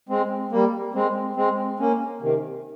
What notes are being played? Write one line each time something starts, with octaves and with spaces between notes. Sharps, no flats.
G#3 C4
G3 A#3
G#3 C4
G#3 C4
A#3 C#4
C3 D#3